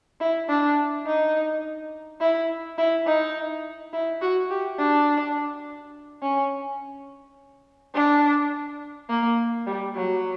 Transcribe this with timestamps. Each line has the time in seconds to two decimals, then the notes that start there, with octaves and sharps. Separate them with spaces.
0.20 E4
0.49 D4
1.06 D#4
2.21 E4
2.78 E4
3.07 D#4
3.93 E4
4.21 F#4
4.50 G4
4.79 D4
6.22 C#4
7.95 D4
9.09 A#3
9.67 G3
9.95 F#3